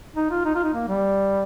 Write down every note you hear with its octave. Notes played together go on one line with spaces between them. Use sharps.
D#4
F4
D#4
F4
D#4
A#3
G3